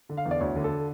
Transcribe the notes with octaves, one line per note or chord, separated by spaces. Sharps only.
D3
F5
E2
D5
D2 C#5
D3
A4